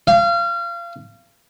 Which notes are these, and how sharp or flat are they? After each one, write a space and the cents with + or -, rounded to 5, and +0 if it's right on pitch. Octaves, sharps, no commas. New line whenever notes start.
F5 -30